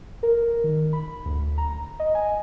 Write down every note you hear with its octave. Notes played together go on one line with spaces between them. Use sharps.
A#4
D#3
B5
D2
A#5
D#5
G#5